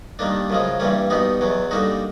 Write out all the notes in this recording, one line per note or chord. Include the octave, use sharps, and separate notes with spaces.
D#3 G3 A#3 D4
F#2 C#3 F3 G#3
G2 E3 G3 A#3 C#4
B2 G3 B3 D#4
E2 B2 F#3
D3 G3 A#3 D#4 F#4